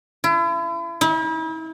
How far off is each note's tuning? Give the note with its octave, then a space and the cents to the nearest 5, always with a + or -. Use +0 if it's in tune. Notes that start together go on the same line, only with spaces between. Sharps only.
E4 +40
E4 -40